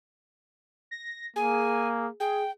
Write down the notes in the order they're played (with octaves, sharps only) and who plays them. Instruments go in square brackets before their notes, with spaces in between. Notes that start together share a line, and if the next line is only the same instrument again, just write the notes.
[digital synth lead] A#6
[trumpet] A#3 [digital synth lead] G#4 [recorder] G#5
[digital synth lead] G#4 [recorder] G5